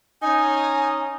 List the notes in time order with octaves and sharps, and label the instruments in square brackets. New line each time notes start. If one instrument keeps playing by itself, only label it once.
[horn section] C#4 D#4 [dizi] G#5